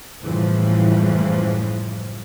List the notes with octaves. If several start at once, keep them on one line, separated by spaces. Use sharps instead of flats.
F#1 A2 C#3 E3 F3 G3